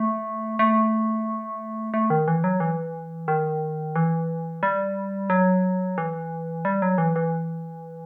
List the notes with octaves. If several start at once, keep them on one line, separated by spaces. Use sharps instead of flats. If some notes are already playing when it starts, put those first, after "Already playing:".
Already playing: A3
A3
A3
D#3
E3
F#3
E3
D#3
E3
G3
F#3
E3
G3
F#3
E3
E3